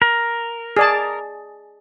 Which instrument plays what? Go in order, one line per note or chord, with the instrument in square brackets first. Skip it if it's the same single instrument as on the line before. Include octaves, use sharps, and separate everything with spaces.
[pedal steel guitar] A#4
[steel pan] G#4 D5 A5